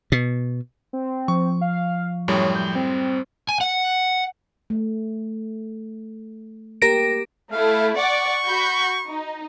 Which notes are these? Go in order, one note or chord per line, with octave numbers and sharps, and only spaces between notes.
B2
C4
F3 C#6
F5
F#2 A2 G3 C#5
G6
C4
G#5
F#5
A3
A#3 G4 A#4 A#6 D7
A3 E4 F5
D5 F#5 C#6
F#4 B5 G6
D#4